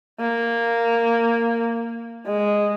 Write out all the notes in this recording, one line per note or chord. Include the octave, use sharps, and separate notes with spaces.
A#3
G#3